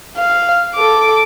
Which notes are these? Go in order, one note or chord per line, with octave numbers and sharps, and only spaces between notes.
F5
A4 D6